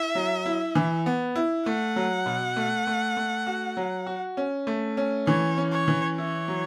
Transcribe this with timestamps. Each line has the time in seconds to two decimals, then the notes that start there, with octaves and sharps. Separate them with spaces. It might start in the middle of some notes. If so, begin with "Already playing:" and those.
Already playing: E4 E5
0.15 F#3
0.46 E4
0.75 E3
1.06 B3
1.36 E4
1.66 A3 F#5
1.96 F#3
2.26 B2
2.56 A3
2.87 A3
3.17 A3
3.47 F#4
3.77 F#3
4.06 F#4
4.37 C#4
4.67 A3
4.97 C#4
5.27 E3 C#5
5.58 C#4
5.72 C#5
5.88 E3
6.17 E4 C#5
6.48 F#3